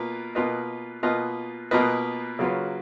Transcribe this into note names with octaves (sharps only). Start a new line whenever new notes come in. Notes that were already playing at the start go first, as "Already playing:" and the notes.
Already playing: B2 A#3 F4 B4
B2 A#3 F4 B4 D#5
B2 A#3 F4 B4 D#5
B2 A#3 F4 B4 D#5
C#3 F#3 A#3 F4 B4